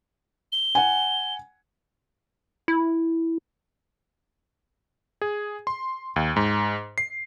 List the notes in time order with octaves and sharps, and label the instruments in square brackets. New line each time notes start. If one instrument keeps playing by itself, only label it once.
[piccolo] G7
[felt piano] F#5 G#5
[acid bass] E4
[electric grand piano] G#4
C6
D#2
G#2
C7